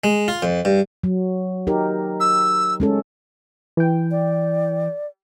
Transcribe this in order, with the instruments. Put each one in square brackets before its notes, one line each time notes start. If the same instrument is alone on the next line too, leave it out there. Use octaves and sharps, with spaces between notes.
[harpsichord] G#3
F4
F2
G2
[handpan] F#3
D#4 G4 A#4
[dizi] E6
[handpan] G#3 C#4 A4
[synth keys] E3 G5
[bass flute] D5